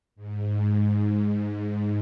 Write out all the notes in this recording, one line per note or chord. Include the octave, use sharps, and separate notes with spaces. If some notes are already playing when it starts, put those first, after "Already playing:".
G#2